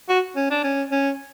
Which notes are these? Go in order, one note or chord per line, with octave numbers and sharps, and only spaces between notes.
F#4
C#4
D4
C#4
C#4